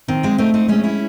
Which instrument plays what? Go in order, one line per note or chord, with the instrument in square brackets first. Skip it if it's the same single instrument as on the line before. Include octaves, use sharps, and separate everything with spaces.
[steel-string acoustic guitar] D#3 [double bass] C4
[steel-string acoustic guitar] G#3 C4
[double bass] A3 [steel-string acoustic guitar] C4 D#4
[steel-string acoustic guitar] C4 D#4
[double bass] G#3 [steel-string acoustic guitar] A3 C#4
[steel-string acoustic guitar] C#4 E4